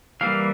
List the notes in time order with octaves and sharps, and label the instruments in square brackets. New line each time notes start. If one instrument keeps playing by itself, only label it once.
[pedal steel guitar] E3 G3 A#3 F5